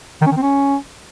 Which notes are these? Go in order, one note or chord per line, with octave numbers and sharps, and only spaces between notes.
D#3
C#4
D#3
C4
C#4